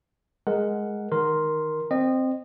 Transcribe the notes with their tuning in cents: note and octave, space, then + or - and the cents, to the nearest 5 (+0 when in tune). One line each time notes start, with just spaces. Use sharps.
G#3 +0 A#4 +0 F#5 +0
D#3 +0 A#4 +5 C6 +0
C4 +0 D#5 -25